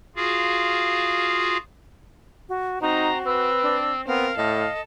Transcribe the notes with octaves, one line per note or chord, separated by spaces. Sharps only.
F4 F#4 G#4 F5
F#4
C4 D#4 F#4 A#5
C4 B4 E6
D4
B3 C4 A#4 F5
A2 A4 D#5